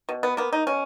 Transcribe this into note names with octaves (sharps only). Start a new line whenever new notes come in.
B2
B3
A#3 B3
D#4
B2 C#4